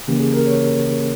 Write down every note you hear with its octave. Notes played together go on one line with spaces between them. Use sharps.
C#3 E3 A#3 C#4 G4
G#4
A#4
C#5